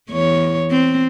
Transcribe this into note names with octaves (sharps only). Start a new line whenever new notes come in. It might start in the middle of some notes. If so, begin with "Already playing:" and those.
E2 C#5
C4